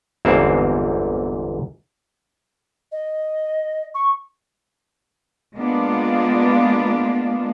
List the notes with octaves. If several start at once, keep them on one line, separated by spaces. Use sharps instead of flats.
G1 E2 G#2 A#3 C4 C5
D#5
C#6
G#3 A#3 B3 D4 F4